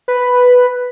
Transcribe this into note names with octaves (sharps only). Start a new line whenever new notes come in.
B4